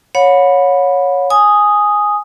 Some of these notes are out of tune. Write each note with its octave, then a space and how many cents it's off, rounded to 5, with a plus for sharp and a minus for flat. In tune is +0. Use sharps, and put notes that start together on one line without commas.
C#5 +0 F#5 -40 B5 +0
G#5 +0 D#6 +0